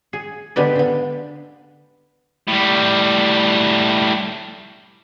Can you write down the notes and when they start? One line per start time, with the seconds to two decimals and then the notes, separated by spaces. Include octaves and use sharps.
0.13 G#4
0.56 D3 G#3 B3 G4 B4 D5
0.75 D3 B3
2.48 A2 G3